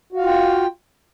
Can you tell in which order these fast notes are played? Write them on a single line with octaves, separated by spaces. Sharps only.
F#4 F5 F4 G5